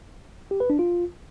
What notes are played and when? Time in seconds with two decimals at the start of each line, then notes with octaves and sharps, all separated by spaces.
0.51 G4
0.60 B4
0.70 D4
0.79 F4